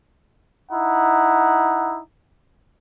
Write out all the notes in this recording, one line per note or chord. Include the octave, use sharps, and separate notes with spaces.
D#4 E4 F#5